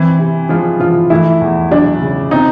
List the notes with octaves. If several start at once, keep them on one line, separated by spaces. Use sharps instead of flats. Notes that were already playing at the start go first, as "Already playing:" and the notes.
Already playing: E3 C4 E4
C3
F3 G#3 F4
E3 F3 F4
E3 A3 E4
E2
F#3 D4
C#3
C4 D#4